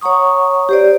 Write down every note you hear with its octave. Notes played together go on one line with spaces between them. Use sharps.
C#5 F#5 A#5 C#6 D#6
G4 C5 D5